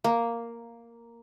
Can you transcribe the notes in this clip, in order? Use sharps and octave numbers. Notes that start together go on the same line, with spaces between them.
A#3